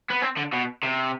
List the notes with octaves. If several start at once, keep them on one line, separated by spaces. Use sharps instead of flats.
B3
C4
D3
B2
C3